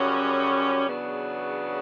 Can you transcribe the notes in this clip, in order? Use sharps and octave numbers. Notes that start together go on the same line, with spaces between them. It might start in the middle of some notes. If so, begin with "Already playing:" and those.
Already playing: F#2 C#3 G3 C#4 F#4
E2 C#3 F#3 B3 D4